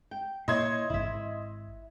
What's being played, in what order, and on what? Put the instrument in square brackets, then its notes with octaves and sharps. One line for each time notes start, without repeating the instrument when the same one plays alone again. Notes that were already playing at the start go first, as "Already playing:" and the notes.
[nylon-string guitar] G5
[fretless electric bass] A#2 [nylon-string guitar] E4 C5 C#5 [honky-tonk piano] D#5 C6 G#6
[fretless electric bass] D#1 G#1 [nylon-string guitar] E4 E5